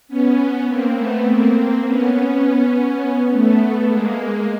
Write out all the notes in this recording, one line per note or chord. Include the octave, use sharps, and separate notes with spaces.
B3 C#4
A#3 C4
A3 B3
A#3 C4
B3 C#4
B3 C#4
A3 B3
G#3 A#3